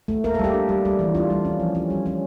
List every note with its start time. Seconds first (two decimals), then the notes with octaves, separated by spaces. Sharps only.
0.08 A3
0.24 A#3 A#4
0.34 A4
0.39 G3 G4
0.54 D4
0.69 G3
0.85 G3
0.99 E3
1.15 D4 F4
1.30 G3
1.45 C#4
1.60 F3
1.75 C#4
1.90 G3
2.06 C#4